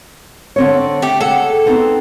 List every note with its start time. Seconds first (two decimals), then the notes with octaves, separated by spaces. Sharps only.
0.56 D3 C4 C#5
1.02 A3 G4
1.21 G#4 A4 F#5
1.66 B3 C4 D#4